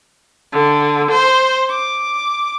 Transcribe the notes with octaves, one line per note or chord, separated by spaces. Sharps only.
D3
C5
D6